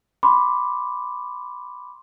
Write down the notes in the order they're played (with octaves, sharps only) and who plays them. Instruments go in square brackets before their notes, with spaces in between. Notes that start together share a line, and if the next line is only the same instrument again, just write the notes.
[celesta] B5 C6 D6